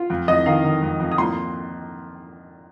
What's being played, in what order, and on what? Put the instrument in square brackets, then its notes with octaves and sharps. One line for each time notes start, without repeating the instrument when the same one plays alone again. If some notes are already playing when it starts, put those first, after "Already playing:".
Already playing: [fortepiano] F4
F2
[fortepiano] F2 [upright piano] D#5
[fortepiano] D#3 [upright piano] F5
[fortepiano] D#3
F2
F2
[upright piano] D#6
[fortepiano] A#2 [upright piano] C6